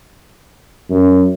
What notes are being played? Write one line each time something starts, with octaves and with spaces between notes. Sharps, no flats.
F#2